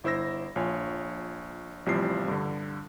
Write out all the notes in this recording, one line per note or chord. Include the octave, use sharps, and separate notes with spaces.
G1 E4 C5 E6 A#6
A#1 F4 C#5 G#5
A1 C3 F3 G3 E4 C7
G2 D3